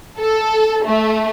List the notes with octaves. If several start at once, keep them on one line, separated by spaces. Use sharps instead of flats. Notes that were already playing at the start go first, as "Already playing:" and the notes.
A4
A3